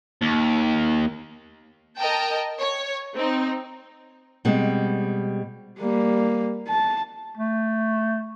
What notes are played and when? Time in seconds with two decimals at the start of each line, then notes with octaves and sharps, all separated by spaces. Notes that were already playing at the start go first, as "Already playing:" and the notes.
0.22 D#2
1.98 A#4 D#5 G5 A5
2.59 C#5
3.14 C4 D#4
4.45 B2 G3 G#3 C4
5.79 G3 A#3
6.68 A5
7.37 A3